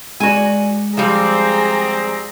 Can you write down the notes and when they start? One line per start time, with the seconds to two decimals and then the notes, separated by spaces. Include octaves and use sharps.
0.20 G#3 F#4 D5 G#5
0.97 F3 G3 C4 G#4 A#5